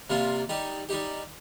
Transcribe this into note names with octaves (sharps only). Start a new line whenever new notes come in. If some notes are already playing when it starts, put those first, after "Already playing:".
C3 G3 A#3 F4
G3 D#4 G4
G3 D#4 G4